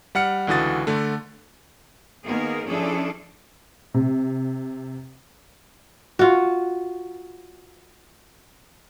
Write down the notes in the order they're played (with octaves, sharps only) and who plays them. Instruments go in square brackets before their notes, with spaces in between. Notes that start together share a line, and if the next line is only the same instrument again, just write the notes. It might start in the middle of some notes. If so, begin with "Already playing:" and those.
[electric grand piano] G3 F#5 F6 C#7
C#2 D3 E3 F#4 D#6 A6
D3 A3
[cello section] D#3 A#3 B3 G#4 A#4
F3 C#4 D4 E4 G#4 A4
[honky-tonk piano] C3
[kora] F4 F#4